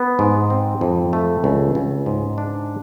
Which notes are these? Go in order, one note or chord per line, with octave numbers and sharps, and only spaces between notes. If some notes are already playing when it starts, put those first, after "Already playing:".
Already playing: B3
G#2
C4
F2
A3
C#2
C#2
G#2
D4